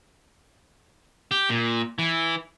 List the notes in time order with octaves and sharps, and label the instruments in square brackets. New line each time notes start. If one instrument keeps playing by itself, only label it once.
[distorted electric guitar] G4
A#2
E3